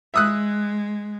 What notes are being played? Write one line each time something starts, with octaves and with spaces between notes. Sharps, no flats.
G#3 E5 D#6 F#6